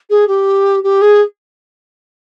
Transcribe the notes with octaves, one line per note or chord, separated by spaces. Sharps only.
G#4
G4
G4
G#4